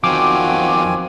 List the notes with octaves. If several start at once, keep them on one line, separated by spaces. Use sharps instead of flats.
E2 D#3 F3 C4 F#4 F5 G#5 D6